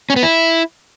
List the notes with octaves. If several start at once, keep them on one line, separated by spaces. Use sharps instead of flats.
C#4
B3
E4